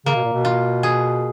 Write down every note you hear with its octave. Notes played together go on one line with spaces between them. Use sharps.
C#3 A#3
B2
A#2
B2
F4
G#4